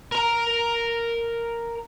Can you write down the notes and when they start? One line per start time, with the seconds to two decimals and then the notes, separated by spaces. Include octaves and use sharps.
0.12 A#4 A#5